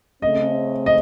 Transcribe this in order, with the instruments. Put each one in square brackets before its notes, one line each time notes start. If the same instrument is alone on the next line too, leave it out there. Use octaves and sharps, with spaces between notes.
[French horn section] C#3 A3 C4 [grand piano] D#5
[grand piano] D#5